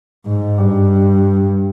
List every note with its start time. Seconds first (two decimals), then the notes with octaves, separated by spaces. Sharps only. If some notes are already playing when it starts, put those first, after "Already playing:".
0.26 G#2
0.58 G2